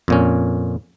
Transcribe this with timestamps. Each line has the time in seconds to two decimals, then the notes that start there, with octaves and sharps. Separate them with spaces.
0.08 F2 A#2 C#4